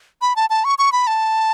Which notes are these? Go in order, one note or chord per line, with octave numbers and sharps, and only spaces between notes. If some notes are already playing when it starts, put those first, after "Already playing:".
B5
A5
A5
C#6
C#6
B5
A5